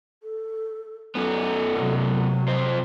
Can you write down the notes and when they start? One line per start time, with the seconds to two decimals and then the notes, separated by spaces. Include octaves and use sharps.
0.23 A4
1.15 F#2 B3 A4
1.73 C3 F#3
2.48 F2 C5